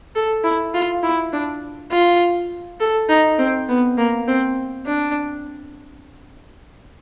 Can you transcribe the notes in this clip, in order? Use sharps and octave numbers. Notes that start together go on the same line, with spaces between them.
A4
E4
F4
E4
D4
F4
A4
D#4
C4
B3
A#3
C4
D4